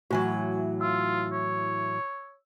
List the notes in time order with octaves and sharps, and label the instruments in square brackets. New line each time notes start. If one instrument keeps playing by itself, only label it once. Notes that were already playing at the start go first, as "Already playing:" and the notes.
[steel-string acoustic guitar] A2 E3 F#3 [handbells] F#4 G#5 G#6
[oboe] F4 [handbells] E6
[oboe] C#5